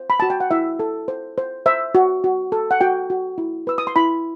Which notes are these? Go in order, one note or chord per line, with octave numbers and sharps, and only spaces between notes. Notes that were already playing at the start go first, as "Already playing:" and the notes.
Already playing: C5
B5
F#4 A5
G5
F#5
E4 E5
A4
C5
C5
C5 E5
F#4
F#4
A4
F#5
F#4 G5
F#4
E4
B4 E6
D#6
C6
E4 B5